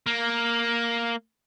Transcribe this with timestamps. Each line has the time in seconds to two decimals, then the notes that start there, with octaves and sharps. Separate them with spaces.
0.06 A#3